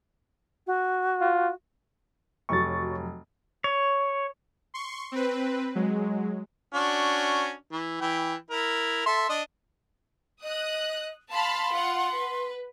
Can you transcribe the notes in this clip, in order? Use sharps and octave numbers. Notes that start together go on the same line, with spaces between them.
F#4
F4
F1 F#3 C#6 A6
C#5
C6 C#6
C4 B4
F#3 G#3
C#4 D4 F#4
E3
E3 G5
E4 A#4
A4 E5 C6
D4 D#5
D#5 D#6 F#6
F5 A5 B5 C6
F4 F#5
B4